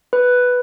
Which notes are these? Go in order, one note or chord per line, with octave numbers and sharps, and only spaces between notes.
B4